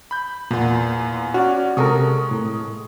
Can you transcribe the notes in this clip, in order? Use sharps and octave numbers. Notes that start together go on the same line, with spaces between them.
B5 G6
E2 A#2 F4 F#5
C#4 F#4 D5
C3 G#3 A4 A#4 C#6 D#6
A2